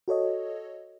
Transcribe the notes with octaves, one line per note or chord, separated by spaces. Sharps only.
F#4 A4 C#5 D#5